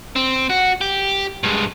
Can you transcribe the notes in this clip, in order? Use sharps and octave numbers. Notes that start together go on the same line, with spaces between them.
C4
F#4
G4
G2 G#3